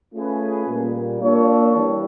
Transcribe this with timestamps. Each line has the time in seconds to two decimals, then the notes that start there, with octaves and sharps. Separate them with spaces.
0.13 A3 C#4 F4 G#4 B4
0.68 A#2 G3 A#3
1.21 A#3 D4 F4 A4 C#5
1.75 E3 G3